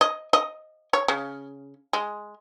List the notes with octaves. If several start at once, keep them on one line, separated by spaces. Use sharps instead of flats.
D#5
D#5
C#5
C#3
G#3